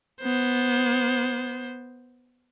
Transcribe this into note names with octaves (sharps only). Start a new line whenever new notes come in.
B3 C5